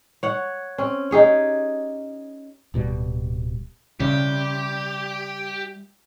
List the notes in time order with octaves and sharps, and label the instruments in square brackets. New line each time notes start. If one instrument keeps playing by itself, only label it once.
[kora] C#5 F#5
C4 C#4
D#4 G4 G#4 C#5
[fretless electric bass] D1 B2 G3
[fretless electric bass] C#3 [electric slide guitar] G3 D5 E5 [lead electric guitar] G4